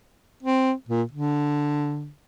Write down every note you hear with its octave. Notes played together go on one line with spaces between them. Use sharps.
C4
A#2
D3